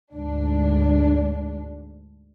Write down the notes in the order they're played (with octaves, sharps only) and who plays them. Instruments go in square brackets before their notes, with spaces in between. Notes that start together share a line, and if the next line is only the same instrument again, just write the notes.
[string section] D2 G#2 D4